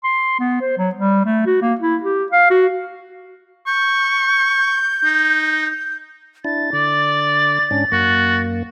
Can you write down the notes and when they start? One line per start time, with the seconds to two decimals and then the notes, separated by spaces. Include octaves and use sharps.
0.04 C6
0.39 B3
0.61 C5
0.78 F#3
0.95 G3
1.25 A3
1.46 F#4
1.62 A#3
1.80 E4
2.03 G4
2.32 F5
2.50 F#4
3.67 C#6 G6
5.05 D#4
6.45 D4 E4 A6
6.73 D3 D5
7.71 G#2 C#4 D4
7.92 F#2 A#3 F#4